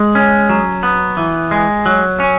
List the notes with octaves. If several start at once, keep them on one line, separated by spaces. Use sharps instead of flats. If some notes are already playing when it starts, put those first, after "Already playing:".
Already playing: G#3
C#4
F#3
B3
E3
G#3
F#3
C#4